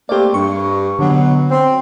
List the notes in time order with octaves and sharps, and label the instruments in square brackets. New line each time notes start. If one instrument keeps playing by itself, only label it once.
[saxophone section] A3 A#3 C4 [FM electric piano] G4 D5
[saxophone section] G2 [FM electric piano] C#6
[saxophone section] B2 F#3 [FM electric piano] D3
[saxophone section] C4